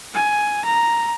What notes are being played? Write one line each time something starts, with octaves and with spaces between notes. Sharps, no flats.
G#5
A#5